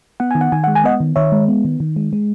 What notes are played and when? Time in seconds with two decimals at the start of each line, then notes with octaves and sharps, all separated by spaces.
0.20 B3 F#5
0.31 D#3 G#5
0.41 F#5
0.52 D#3 G#5
0.64 G#3 F#5
0.75 G#5
0.84 B3 D#5 F#5
1.00 D#3
1.16 D#3 C#5 E5
1.32 G#3
1.48 B3
1.65 D#3
1.80 D#3
1.96 G#3
2.13 G#3